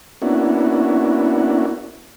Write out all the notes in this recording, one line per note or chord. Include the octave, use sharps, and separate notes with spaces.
A#3 B3 C#4 D4 E4 F#4